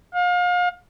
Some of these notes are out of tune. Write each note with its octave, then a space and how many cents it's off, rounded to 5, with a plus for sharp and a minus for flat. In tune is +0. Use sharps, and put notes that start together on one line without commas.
F5 +35